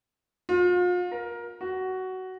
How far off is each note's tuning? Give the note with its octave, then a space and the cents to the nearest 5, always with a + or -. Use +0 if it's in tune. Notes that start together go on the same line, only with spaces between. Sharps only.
F4 +40
A#4 +20
F#4 +15